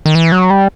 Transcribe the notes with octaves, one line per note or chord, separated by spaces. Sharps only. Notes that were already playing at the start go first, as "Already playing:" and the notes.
D#3
E3
F#3
G3